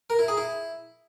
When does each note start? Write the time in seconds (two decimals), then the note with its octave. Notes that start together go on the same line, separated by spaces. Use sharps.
0.10 A#4
0.19 E4
0.28 G#4
0.37 E4